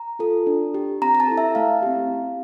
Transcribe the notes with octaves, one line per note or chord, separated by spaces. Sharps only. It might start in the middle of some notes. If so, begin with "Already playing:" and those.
Already playing: A#5
F4 A4
D4
G4
C4 A#5
A#5
A5
E4 A4
E5
A3 F5
C4 E4 G4
C4